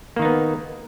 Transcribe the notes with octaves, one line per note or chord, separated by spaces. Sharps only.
D#3 A#3 B3 D#4